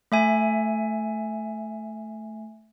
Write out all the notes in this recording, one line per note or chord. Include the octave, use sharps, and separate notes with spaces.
A3 E5 G#5